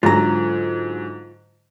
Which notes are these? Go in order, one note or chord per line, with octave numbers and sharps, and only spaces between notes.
G#2 D3 F#3 F4 A#5